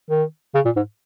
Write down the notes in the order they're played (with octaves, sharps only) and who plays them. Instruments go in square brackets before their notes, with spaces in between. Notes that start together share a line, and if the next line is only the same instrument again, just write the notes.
[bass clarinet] D#3
C#3
A#2
G#2